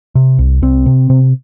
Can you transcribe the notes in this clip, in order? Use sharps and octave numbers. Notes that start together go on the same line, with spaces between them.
C3
C2
C2 C4
C3
C3